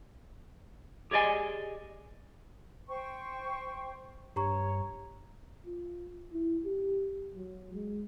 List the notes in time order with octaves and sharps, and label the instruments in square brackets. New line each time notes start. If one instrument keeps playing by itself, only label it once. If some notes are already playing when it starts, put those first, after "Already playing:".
[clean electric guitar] G4 G#4 D5 D#5 G#5
[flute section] C5 G5 C#6
[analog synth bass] G2 [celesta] G4 A#5 C#6 [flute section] C#5
[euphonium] F4
E4
G4
F#3
G#3